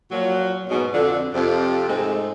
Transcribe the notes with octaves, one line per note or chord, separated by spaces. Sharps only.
A#2 F3 F#3
G#2 B2
F2 D3
F2 C3
G#2 G#3 A3 C4